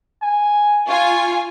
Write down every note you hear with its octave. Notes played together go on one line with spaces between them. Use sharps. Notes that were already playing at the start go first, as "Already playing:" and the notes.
G#5
F4 G#5 C#6